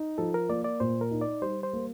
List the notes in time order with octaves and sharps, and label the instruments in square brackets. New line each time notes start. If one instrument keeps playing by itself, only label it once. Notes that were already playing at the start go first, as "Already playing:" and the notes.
Already playing: [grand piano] D#4
[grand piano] F3 [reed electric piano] A4
[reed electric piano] A#4
[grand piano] A#3 [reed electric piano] D5
[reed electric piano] D5
[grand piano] A#2 [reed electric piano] C5
[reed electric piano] A#4
[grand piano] D#4
[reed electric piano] D5
[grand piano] G3 [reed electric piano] C5
[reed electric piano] C5
[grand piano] A#3